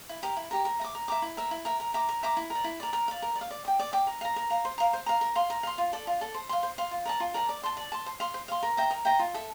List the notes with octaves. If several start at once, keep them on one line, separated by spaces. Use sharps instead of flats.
E4
G4 A#4
E4
G4 A#4
A#4
E5 A#5
D6
A#4
E5 A#5 D6
E4
A#4 E5
E4
A#4 E5
A#4
E5 A#5 D6
A#4
E5 A#5 D6
E4
A#4 D5
E4
A#4 D5
A#4
D5 F5
A#4
D5
F5
D5
G5 D6
D5
G5 D6
A#4
F5 A#5
A#4
F5 A#5
C5
F5 A#5
C5
F5 A#5
A#4
F5 C6
A#4
F5 C6
F4
A4 D5
F4
A4 D5
C5
F5 C6
C5
F5 C6
F4
A#4 D5 A5
F4
A#4 D5 A5
D5
A5 C6
D5
A5 C6
C5
F5 C6
C5
F5 C6
A#4
E5 G5 A#5
A#4
E5 G5 A#5
F4
A4 E5